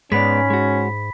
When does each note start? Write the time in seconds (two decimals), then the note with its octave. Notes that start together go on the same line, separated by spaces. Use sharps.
0.12 G#2 G#3 B3 C#4 D5 B5 B6
0.50 G#3 F#4